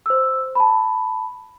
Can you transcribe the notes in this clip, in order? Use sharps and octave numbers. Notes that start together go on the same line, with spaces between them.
C5 E6
A5 B5